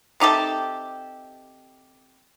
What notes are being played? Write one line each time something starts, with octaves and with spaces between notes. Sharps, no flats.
C3 D#4 G4 A4